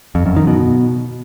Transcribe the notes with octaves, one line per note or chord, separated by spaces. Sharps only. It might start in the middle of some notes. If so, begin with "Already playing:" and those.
F2
F#2
D#3
B2